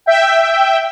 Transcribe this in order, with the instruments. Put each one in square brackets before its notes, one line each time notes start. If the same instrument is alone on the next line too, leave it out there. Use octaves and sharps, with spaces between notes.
[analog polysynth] E5 G5